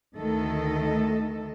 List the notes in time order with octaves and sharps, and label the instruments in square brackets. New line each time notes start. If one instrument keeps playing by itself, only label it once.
[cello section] D2 D#3 A3 A4 D#5